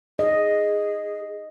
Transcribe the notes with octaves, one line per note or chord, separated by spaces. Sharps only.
G#4 D#5